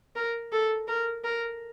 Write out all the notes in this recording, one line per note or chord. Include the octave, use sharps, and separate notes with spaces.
A#4
A4
A#4
A#4